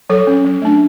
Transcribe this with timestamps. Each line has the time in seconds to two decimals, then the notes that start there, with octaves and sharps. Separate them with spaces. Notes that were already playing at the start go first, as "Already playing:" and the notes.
0.10 F#3 A4 C#5
0.27 C#4
0.45 F#3
0.62 A3 D4